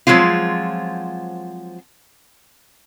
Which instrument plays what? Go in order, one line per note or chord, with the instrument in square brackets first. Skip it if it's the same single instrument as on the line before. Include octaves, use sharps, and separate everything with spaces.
[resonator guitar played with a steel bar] F3 F#3 G#3 C4 F4